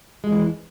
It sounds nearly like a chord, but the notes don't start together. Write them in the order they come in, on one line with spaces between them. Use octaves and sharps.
G#3 F2 E3